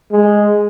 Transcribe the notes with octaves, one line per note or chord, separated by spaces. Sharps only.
G#3